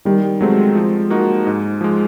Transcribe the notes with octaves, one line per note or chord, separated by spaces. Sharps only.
D#3 G3
F#3 G#3 A3 C4
F3
A#3 D#4 F#4
G#2
F3 G#3